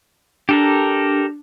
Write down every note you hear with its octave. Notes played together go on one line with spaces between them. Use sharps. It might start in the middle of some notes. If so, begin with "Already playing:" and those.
D4 G4 A4 A#4